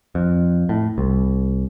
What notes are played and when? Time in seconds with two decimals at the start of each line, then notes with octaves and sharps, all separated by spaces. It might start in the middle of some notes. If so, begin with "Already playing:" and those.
0.15 F2
0.69 A2
0.98 C2